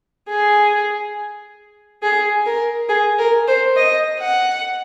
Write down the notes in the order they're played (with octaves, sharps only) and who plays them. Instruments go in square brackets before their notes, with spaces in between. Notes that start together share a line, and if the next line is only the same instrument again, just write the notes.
[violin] G#4
G#4
A#4
G#4
A#4
C5
D#5
F#5